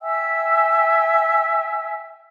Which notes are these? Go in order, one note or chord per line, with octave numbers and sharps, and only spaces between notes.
E5 G5 G#5 E6